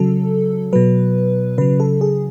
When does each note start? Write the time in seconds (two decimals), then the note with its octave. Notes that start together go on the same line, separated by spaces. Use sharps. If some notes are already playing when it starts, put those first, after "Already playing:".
Already playing: C#3 F#3 A4
0.73 B2 F#3 B4
1.58 C#3 F#3 B4
1.80 A4
2.01 G#4